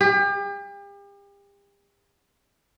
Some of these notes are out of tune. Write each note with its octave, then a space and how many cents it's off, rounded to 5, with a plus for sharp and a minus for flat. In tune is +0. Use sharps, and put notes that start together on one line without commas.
G4 +40